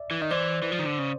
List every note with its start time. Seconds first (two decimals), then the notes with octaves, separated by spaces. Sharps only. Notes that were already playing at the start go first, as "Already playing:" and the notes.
Already playing: D5 E5
0.11 E3
0.21 D#3 D#5
0.31 E3 C5 D5
0.62 E3
0.72 F3
0.79 D#3
0.86 D3
0.99 C#3